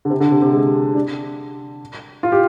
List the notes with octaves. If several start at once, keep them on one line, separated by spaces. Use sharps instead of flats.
D3
C3
D3
C3
C3
G#3
D4
F4
G4